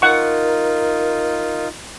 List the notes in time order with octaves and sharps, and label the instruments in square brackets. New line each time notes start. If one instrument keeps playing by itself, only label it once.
[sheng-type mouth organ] D#4 F4 [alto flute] A#4 [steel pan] F#5 C#6